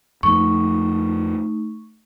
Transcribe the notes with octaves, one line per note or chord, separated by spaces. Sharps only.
F2 F3 A3 A#3 D#4 C#6